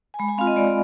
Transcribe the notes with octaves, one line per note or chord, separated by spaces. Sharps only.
G#5
G#3 B5
G#5
C4 F4 F5
D#5
G#3 D5